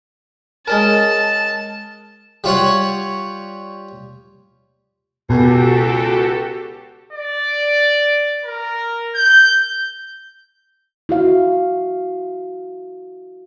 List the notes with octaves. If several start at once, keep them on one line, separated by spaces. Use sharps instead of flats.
G#3 C#4 A#4 A5
G3 F4 C#5 F#5
C#2 B2 F#4 G4 A4
D5
A#4
G6
E4 F#4 F5